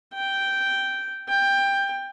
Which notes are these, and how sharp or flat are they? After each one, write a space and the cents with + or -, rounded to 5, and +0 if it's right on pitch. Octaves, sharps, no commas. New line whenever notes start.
G5 -5
G5 +15